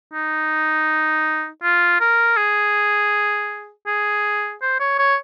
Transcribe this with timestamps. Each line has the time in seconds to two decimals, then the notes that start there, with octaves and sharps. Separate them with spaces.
0.13 D#4
1.63 F4
2.00 A#4
2.37 G#4
3.87 G#4
4.62 C5
4.80 C#5
4.99 C#5